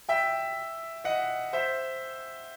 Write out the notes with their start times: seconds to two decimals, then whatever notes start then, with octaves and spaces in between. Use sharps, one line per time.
0.09 E5 G5
1.04 D#5 F#5
1.53 C5 E5